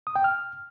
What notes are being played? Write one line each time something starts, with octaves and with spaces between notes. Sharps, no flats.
D#6
G5
F6